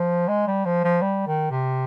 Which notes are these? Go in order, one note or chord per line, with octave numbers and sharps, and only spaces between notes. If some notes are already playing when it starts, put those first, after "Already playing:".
Already playing: F3
G#3
G3
F3
F3
G3
D#3
C3